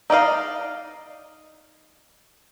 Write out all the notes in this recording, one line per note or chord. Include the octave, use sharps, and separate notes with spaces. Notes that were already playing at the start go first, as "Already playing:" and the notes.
D#4 D5 D#5 F5